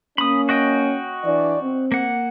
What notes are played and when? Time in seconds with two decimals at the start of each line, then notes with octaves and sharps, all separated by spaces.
0.18 A#3 C#4 B5 D#6
0.49 F#4 D#5 G5
1.24 E3 D4 D5
1.61 C4
1.92 A#3 F#5